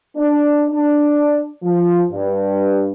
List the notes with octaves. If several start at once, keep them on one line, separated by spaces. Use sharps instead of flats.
D4
D4
F3
G2